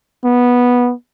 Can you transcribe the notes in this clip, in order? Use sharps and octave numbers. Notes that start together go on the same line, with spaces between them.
B3